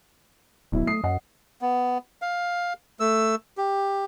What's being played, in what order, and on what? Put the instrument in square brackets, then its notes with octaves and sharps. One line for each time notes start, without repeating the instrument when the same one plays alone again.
[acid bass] D1 [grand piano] B2 F#3 E4
[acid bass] A3 [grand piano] D#6 C7
[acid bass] F#2 [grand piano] D#5 F#5
[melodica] B3
F5
A3 E6
G4